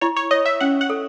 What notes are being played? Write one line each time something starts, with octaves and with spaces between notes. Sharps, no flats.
E4 C#5
C#5
C#5 D#5
E5
C#4 F#5
F#5
A4